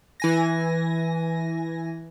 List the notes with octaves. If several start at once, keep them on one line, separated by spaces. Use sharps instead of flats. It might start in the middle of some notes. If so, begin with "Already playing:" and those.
E3 G#5 A#6